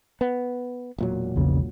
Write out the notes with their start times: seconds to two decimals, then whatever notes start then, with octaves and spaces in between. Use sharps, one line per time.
0.21 B3
0.98 E1 A#2 F#3
1.36 A#1 E2 C#3